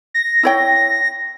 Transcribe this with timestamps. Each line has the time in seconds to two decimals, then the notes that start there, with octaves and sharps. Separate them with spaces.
0.14 A#6
0.43 E4 C#5 G5